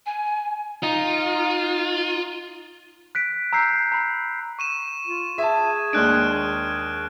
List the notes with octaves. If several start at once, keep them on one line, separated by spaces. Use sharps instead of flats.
G#5
D#4 F4
F#6 B6 D7
A#5 E6 G6 C7
A#5 B5
C#6 D#7 E7
F4
G#4 E5 A5
D#2 G#3 D4 F6 F#6 D7
G#4